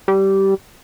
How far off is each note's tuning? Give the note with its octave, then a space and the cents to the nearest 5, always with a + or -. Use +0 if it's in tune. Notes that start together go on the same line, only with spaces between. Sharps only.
G3 -15